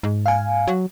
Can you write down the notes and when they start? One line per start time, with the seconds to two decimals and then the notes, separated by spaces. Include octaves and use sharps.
0.03 G#2
0.26 F5 G#5
0.68 F#3